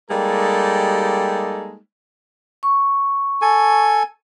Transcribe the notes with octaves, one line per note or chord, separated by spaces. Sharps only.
G3 G#3 A#3 D#4 G4 A4
C#6
A4 G#5